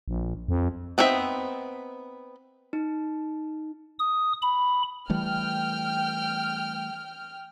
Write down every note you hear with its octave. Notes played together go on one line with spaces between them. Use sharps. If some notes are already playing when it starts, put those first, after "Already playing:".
A#1
F2
B3 C4 D#4 C5 E5
D#4
D#6
B5
E3 G3 A3 G5 F6